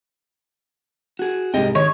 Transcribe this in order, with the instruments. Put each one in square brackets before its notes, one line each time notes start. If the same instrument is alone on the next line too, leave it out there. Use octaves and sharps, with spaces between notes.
[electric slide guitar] F#4 G#4
[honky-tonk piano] C2 G#2 C3 [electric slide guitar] G4 D#5 G5
[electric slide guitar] D#3 [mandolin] C#5 [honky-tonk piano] D#5 C6